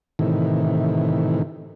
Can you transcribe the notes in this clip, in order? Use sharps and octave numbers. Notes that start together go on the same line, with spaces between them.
A2 C3 D#3 E3